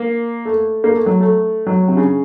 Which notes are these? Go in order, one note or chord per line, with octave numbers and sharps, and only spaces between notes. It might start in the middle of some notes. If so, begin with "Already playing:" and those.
Already playing: A#3
A3
A#3
A3
F#3
A3
F#3
C3
C#3